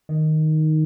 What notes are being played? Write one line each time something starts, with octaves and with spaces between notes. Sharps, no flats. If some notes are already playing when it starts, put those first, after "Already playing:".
D#3